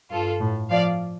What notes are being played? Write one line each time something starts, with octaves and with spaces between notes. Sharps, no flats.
G2 F4 A4
A2
F3 D5 F5